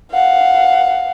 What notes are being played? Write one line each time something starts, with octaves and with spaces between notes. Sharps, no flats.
F5 F#5